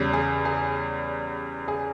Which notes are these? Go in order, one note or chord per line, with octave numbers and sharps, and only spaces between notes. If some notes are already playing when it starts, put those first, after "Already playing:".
Already playing: E2 C#3 G3
G#4
G#4
G#4